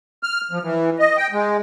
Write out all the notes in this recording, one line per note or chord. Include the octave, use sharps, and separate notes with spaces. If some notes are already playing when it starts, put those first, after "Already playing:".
F6
F3
E3
D#5
G5
G#3